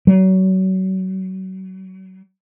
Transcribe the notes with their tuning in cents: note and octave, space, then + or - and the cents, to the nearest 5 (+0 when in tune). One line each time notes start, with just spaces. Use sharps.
F#3 +30